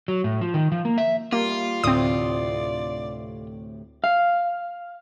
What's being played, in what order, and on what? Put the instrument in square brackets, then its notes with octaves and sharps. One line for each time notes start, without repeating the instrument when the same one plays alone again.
[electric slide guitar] F#3
A2
F3
D#3
F3
A#3
E5
[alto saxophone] G3 [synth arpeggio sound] A#3 [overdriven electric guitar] F4
[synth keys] D2 A2 C3 [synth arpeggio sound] C4 D#6 [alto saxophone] D5
[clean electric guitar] F5